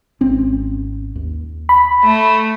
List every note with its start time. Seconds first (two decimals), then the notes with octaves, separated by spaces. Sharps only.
0.21 G#1 C4 C#4
1.16 D#2
1.69 B5
2.04 A3